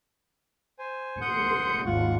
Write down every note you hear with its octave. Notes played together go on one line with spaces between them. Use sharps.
C5 G#5
F#5 C6 D#6 G6 C#7
G#1 D#2 F4 F#5 C#6